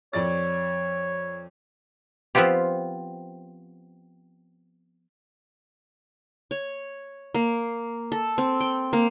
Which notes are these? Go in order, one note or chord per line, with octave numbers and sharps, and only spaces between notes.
F2 C#5 D5 A6
F3 B3 C4 F4 G4
C#5
A#3
A4
C4
G5
A#3